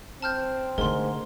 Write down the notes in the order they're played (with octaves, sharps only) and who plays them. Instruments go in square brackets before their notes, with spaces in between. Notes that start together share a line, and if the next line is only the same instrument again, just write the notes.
[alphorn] C4 [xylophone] A5 F6 G6
[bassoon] G#2 [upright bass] D3 A3 [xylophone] A#4 C6